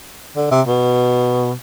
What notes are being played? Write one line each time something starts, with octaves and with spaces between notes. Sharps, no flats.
D3
C3
B2